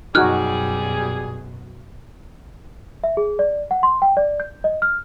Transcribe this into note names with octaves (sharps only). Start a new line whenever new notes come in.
F#2 B2 G3 D#4 F#4 G#4 F6 F#6
E5
G#4
D5
F#5
C6
G5
D5
G6
D#5
F6